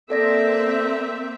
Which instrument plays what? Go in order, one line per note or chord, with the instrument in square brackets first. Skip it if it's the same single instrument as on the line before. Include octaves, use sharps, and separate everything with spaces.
[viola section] A#3 C4 E5 [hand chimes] A4 D5 A#6